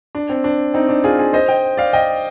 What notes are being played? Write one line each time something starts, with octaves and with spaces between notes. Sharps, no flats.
D4
C4
D4
C4 D#4
D4
F4 G#4
F4 G#4
C5 D#5
D#5 G5
D5 F5
D#5 G5